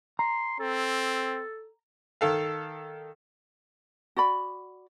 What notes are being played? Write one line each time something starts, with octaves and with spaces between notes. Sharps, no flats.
A#5 C6
C4 A4
D#3 A4 F5
F#4 D5 B5